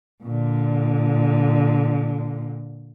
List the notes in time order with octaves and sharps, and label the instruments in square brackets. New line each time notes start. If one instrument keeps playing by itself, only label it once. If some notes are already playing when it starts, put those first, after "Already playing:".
[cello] A#2 D3